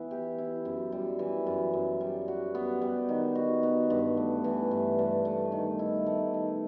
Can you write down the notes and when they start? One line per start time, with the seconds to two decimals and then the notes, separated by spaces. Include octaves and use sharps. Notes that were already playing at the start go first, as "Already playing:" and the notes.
Already playing: E3 B3 E4
0.11 G4
0.38 E4
0.65 F#2
0.92 G3
1.19 E3
1.46 F#2
1.73 F#2
2.00 G3
2.28 F#4
2.55 B3
2.82 G3
3.09 D#3
3.35 F#4
3.63 B3
3.90 G2
4.17 A3
4.44 E3
4.71 G2
4.99 G2
5.25 A3
5.52 D#3
5.79 E4
6.06 A3
6.34 D#3